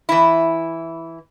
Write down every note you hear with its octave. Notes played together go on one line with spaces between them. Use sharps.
E3 E4